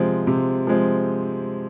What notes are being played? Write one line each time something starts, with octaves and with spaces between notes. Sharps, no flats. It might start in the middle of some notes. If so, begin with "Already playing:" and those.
Already playing: C3 F3 G#3 C4
C3
F3 G#3 C4